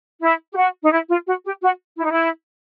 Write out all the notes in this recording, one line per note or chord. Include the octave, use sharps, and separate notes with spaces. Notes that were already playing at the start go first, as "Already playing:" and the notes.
E4
G4
F#4
D#4
E4
F4
F#4
G4
F#4
E4
D#4
E4